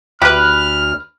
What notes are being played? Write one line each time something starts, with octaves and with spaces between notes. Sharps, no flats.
D2 G4 B4 B5 F6 F#6